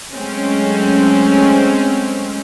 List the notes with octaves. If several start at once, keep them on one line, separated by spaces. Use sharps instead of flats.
F#3 G#3 A3 C4 C#4